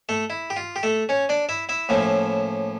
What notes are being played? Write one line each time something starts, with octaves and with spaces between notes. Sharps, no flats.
A3 A4
E4
G4
F4
G4
A3 A4
C#4 C#5
D4 D5
E4 E5
E4 E5
A2 F3 A#3 C#4